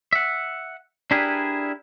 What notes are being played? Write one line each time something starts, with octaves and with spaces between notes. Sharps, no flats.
E5 F#5
D4 E4 G4 G#4 A#4 B4